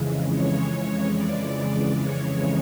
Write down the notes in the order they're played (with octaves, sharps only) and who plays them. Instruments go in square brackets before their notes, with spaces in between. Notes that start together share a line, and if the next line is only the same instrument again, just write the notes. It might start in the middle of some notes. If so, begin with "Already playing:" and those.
Already playing: [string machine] F2 C#3 E3 G#3
C#5
D5
C#5